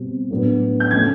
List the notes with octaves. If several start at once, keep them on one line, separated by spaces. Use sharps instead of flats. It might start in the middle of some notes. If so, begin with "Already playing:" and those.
Already playing: B2 G3 C4
A2 F#3 B3 D4
G6
C#3 F3 A3 G#6